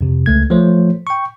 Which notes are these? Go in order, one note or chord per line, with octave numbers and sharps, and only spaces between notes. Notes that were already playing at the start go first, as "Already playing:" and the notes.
F2 C3
C#2 A3 G#6
F3 A3 C5 C#5
G5 C#6